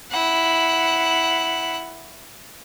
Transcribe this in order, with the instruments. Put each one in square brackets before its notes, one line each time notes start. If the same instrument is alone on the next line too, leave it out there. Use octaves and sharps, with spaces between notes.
[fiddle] E4 F#5